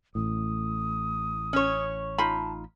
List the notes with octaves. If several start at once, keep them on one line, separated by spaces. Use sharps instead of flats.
A1 A2 D#6
C#4 C#5
D#4 F4 A5 B5